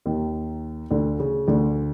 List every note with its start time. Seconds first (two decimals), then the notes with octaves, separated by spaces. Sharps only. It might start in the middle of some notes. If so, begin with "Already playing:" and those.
0.06 D#2 D#3
0.91 D2 D3
1.19 C#3
1.47 D2 D3